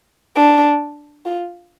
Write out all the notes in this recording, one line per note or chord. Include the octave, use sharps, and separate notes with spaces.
D4
F4